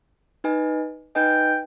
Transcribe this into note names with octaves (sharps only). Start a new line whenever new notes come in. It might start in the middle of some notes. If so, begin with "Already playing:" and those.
D#4 B4 D#5 G#5
D#4 B4 D#5 G5 G#5